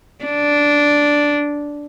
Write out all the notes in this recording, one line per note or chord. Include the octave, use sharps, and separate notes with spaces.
D4